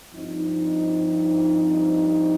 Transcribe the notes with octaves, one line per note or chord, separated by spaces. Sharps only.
G2 F3 C4 D#4